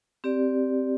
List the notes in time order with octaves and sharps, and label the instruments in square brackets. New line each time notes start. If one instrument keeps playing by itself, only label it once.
[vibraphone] C4 G4 D5